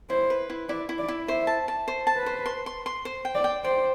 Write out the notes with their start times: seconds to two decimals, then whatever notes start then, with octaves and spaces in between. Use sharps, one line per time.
0.10 E4 C5
0.30 B4
0.50 E4
0.69 E4 D5
0.89 E4
0.99 D5
1.08 E4
1.28 C5 E5
1.47 A5
1.68 A5
1.88 C5
2.07 A5
2.17 B4
2.26 C5
2.46 C6
2.66 C6
2.86 C6
3.05 C5
3.25 G5
3.35 D5
3.44 G5
3.65 C5 D5